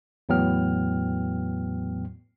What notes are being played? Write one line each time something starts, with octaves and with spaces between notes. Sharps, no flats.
E2 A2 F#3 B3 G5 F6